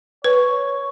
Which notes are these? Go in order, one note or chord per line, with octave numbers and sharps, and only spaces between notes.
B4 C#5